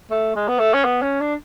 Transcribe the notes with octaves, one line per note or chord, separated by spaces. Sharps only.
A3
G#3
B3
A3
C#4
B3
C#4
D4